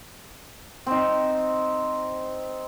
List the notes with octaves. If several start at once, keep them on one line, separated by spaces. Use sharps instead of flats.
C4 D#4